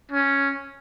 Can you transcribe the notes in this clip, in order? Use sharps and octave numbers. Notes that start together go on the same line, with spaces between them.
C#4